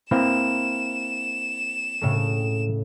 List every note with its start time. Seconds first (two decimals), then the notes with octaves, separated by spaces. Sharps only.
0.11 A#3 C4 E4 E7
2.01 A2 C#3 A3